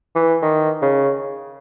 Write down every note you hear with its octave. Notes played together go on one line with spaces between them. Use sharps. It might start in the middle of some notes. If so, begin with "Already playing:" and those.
E3
D#3
C#3